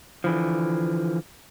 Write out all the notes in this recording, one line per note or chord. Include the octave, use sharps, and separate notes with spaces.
D3 E3 F3